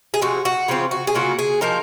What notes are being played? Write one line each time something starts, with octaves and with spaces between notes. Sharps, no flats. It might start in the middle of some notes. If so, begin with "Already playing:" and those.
G#4
C3 F3 G#3 F#4
F#4
C#3 F3 C4 F4
F#4
G#4
C#3 F#3 A#3 F4 F#4
G#4
F3 A#3 D#4 A#4